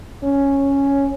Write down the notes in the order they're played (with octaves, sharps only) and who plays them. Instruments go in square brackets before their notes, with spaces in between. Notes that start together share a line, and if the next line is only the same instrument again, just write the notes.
[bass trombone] C#4